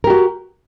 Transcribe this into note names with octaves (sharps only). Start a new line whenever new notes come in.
F#4 G4 A#4